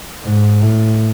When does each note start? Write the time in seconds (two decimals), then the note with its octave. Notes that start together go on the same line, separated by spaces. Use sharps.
0.24 G#2
0.62 A2